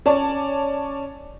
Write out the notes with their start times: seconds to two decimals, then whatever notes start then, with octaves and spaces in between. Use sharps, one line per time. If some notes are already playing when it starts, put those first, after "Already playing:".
0.06 C#4 C#5 D5 A5